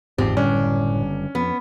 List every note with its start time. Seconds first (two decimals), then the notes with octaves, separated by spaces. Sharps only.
0.18 G1 E2 G#2 F3 C4 G4
0.37 F#1 A2 D3 G3 C#4 D4
1.35 F2 B3